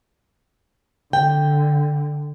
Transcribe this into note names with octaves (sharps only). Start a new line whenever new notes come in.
D3 G5